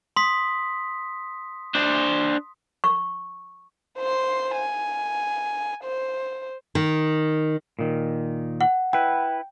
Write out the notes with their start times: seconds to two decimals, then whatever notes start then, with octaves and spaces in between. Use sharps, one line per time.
0.16 C6 D#6 B6
1.75 D4 C5
2.84 C#6
3.98 C5 C6
4.55 G#5
5.84 C5
6.75 D#3
7.79 A#2 D#3
8.61 F#5
8.93 E4 B4 G5